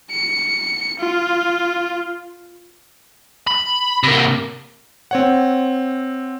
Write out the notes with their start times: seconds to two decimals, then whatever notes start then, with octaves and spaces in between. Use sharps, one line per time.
0.11 C#7
0.99 F4
3.47 B5
4.03 C3 A#3
5.11 C4 C#5 F#5